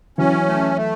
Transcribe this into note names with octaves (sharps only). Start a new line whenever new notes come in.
E3 F#3 C#4
A3
A3